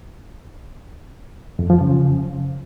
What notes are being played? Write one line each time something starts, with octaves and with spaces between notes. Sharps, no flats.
F2
F3
C#3